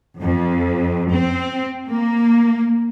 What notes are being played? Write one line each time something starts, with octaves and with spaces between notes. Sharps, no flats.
F2
C4
A#3